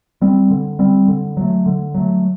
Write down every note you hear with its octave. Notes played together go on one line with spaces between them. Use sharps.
G3 C4
D3
G3 C4
D3
F#3 A3
D3
F#3 A3